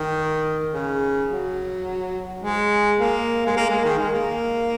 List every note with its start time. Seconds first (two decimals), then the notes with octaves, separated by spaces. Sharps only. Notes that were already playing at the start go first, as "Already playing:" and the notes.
Already playing: D#3
0.73 C#3
1.30 F#3
2.42 G#3
2.99 A#3
3.47 G#3
3.57 A#3
3.70 G#3
3.85 D#3
3.98 G#3
4.13 A#3